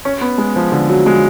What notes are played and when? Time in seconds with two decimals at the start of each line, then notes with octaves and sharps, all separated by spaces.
0.05 C#4
0.21 B3
0.38 G#3
0.56 F3
0.72 D3
0.89 F#3
1.06 G#3